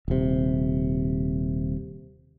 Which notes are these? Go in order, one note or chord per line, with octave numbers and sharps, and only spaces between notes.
D#1 C3